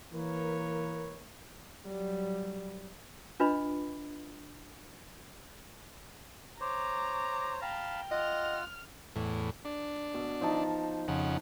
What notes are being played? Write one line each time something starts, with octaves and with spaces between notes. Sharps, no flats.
E3 A#3 A#4 B4 C#5
F#3 G3
D4 F4 B4 D#5 B5
C5 C#5 A#5 D6
F5 G5 A5 B5
F4 D#5 F#5 F6
E2 A2
D4
B2
F3 D#4 A5
F2 C#3 F#5